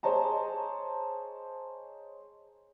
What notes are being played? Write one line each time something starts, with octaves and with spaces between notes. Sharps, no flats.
G#4 C5 C#5 D#5 A5 A#5